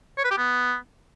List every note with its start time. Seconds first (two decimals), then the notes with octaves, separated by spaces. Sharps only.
0.18 C#5
0.25 B4
0.31 G4
0.38 B3